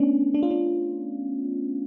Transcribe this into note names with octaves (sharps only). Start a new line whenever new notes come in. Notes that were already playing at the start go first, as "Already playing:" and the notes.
Already playing: A3 B3 C#4 D4
D4
F4
D4